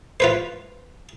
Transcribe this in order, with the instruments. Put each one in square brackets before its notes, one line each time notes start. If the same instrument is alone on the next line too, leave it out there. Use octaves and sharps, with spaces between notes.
[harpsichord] F4 B4 C5